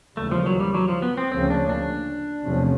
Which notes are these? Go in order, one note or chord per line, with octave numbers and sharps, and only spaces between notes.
D#2 C#3 E3 G3 A3
F3
F#3
G3
F#3
F3
B3
C4
D2 C#3 F3 A#3 C4 C#4
D4
D4
E2 C3 F3 A3 C#4